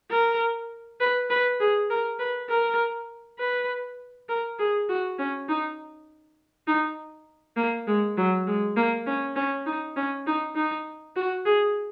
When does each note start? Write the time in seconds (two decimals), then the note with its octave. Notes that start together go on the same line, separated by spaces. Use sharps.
0.10 A#4
1.00 B4
1.30 B4
1.60 G#4
1.90 A#4
2.19 B4
2.50 A#4
3.39 B4
4.29 A#4
4.59 G#4
4.89 F#4
5.19 C#4
5.49 D#4
6.67 D#4
7.57 A#3
7.87 G#3
8.17 F#3
8.47 G#3
8.76 A#3
9.06 C#4
9.36 C#4
9.66 D#4
9.96 C#4
10.26 D#4
10.55 D#4
11.16 F#4
11.45 G#4